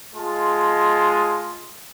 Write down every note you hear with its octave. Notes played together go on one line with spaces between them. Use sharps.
G#3 F4 A5